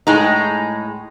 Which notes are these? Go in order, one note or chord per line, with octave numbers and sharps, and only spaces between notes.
A2 G#3 D#4